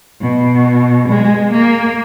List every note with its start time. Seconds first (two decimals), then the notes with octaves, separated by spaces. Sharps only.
0.21 B2
1.08 G#3
1.51 A#3